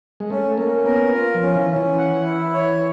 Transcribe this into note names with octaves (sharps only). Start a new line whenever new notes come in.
G#3
A3 C#4
A#3 C#4
B3 A#4
F4
F3
C#4
E3
C#4
E3
F#5
E4
C#5